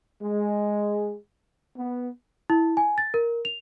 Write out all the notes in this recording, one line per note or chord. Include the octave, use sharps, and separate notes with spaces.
G#3
B3
E4
G#5
A6
A#4
F7